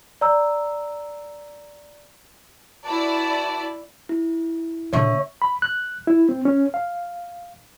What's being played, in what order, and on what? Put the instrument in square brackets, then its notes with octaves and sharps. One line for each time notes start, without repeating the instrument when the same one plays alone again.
[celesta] D5 A#5 E6
[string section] E4 D5 [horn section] F#4 B4 A5
[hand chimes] E4
[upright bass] A#2 D3 [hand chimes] C#5 E5 C#6
[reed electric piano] B5
F#6
E4
C4
C#4
F5